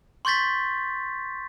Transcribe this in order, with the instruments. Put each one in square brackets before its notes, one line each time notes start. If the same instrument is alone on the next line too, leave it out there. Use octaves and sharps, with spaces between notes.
[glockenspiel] C6 C#6 G6 A6 B6